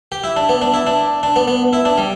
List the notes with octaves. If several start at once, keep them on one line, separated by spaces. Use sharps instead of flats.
G4
E4
D4
B3
D4
E4
D4
D4
B3
B3
E4
D4
G3